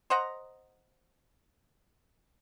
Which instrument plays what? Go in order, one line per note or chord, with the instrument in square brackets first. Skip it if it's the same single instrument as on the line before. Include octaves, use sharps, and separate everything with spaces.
[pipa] C5 D#5 F#5 A#5